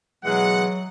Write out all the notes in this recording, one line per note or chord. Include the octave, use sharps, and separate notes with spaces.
B2 E3 F#3 G#3 F#5